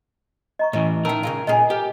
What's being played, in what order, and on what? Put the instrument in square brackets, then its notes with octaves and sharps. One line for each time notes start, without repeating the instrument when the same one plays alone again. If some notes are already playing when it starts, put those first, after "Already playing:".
[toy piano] D#5 A#5 C#6
[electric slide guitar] A2 E3 [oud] C#4
[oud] D#3 E4 [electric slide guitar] A#4 [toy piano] G5 A5 E6
[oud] C#3 G#3 F4
[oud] A#2 C#4 G#4 [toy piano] D#5
[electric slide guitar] G4 [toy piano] A4 [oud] A#4